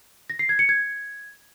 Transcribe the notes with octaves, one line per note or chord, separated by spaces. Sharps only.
A#6
C7
G#6
C#7
G#6